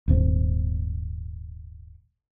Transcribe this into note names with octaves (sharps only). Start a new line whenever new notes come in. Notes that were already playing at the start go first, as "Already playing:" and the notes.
D#1 G#1 C4